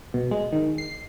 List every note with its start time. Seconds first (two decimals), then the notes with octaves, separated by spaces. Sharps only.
0.14 B2
0.31 G#3
0.52 D#3
0.78 C7